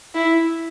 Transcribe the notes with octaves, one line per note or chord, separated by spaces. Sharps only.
E4